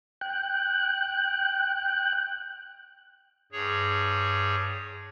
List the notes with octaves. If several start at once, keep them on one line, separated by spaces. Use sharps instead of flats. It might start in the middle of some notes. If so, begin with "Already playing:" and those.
G5 F#6
G2 G#4 C#5